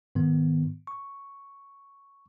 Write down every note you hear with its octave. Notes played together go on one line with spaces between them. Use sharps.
G#2 D#3 B3
C#6